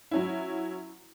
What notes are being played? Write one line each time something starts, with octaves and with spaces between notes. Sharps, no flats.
F#3 C#4 E4